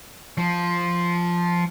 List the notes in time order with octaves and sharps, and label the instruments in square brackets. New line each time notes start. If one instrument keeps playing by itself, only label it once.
[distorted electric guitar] F3